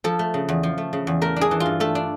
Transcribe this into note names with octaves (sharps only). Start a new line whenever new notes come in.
F3 A4
A3
C#3
E2
F3
A3
C#3
E2
A3 A#4
D4 G#4
E3
F4
G2
A3 A4
D4